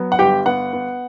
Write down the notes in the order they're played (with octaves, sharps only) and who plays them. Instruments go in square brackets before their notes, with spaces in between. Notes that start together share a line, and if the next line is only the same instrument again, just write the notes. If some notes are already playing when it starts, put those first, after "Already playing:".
Already playing: [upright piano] F#3 B3
F#5
G1 G4 G5
B3 F#5
B3